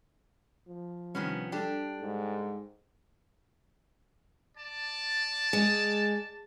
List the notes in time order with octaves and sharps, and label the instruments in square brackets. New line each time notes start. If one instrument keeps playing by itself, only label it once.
[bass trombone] F3
[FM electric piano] C3 G3 [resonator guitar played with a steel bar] D#3 B3 C#4
[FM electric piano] G3 A4 G5 [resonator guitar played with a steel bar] D4 G4
[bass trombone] G#2
[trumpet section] D5 A5
[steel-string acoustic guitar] G#3